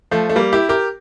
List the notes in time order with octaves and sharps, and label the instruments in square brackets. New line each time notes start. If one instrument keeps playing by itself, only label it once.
[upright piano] F3 A3
A3
G3 A#3
E4 G4
G4 A#4